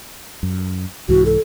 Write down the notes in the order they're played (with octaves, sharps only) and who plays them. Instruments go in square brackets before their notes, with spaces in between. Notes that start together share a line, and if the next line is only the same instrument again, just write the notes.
[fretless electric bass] F#2
[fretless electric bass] C2 G#2 E3 [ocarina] F#4
[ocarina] A4